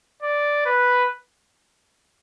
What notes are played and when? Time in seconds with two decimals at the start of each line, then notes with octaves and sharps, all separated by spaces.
0.23 D5
0.66 B4